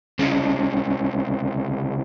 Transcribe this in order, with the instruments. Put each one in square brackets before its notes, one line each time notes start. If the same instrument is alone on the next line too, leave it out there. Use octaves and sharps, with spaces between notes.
[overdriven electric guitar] C2 C#3